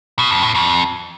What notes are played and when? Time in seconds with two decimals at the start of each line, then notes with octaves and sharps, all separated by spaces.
0.19 B2
0.31 F2
0.43 A2
0.55 F2